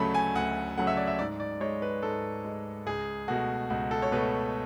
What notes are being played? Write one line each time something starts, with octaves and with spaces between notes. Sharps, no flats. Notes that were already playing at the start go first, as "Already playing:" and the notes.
Already playing: D2 C#3 F#3 A3 A5 B5
G#5
D2 F#5
C#3 F#3 A3 F#5
E5
D5
E5
G#2 D5
D5
G#3 C#5
B4
G#2 A4
G#3
C#2 G#4
B2 A3 F#4
C#2 F#4
A4
C#5
B2 A3 B4